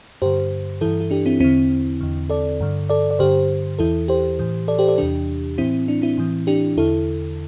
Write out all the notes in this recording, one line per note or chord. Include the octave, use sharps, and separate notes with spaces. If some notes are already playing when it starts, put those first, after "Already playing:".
G2 D3 G4 C5
G2 E3 E4 A4
E4
D4 G4
C4 E4
E2 D3 C4 E4
E2 D3
A4 D5
G2 D3
A4 D5
D5
G2 D3 G4 C5
E2 E3 E4 A4
G4 C5
A2 E3
A4 D5
G4 C5
A4 D5
E2 C3 E3 D4 G4
A2 E3 C4 E4
D4
C4 E4
A2 E3
D4 G4
E2 D3 E4 A4